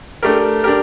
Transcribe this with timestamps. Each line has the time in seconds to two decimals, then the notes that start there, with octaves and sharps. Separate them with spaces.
0.23 A3 D4 G4 A#4
0.64 D4 G4 A#4